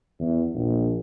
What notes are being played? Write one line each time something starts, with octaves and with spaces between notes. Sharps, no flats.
E2
A#1